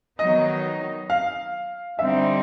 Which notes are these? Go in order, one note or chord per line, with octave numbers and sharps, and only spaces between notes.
D#3 F#3 B3 D#4 D#5
F5
D3 G3 C4 D#4 E5